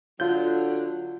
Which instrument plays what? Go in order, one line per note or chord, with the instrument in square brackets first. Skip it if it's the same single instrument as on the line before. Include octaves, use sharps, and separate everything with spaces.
[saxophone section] D3 F#3 [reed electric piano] F4 G6